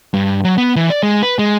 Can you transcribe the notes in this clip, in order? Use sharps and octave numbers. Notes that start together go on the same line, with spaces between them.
G2
F#3
B3
E3
D5
G#3
B4
G#3